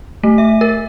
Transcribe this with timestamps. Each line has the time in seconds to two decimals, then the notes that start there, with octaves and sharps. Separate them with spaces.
0.23 A3
0.38 E5
0.61 A#4